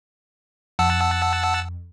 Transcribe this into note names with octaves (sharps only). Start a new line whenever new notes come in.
F2 F#5 A5 E6